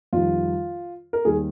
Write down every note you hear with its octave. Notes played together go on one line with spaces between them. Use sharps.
F2 D#3 G3 F4
A#4
D#2 D#3 G3 G#4